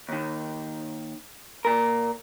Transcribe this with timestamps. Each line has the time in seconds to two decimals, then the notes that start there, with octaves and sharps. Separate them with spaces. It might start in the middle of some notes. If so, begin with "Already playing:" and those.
0.09 D#2 D#3
1.65 A#2 A#4